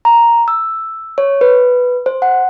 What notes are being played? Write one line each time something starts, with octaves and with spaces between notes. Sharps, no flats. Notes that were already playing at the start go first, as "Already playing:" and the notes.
A#5
E6
C#5
B4
C5
F#5